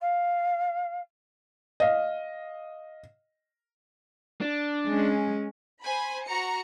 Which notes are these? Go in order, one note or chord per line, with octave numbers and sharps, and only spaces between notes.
F5
D#5 F5
D4
G#3 C#4
C5 G#5 B5
F#4 A#5 C#7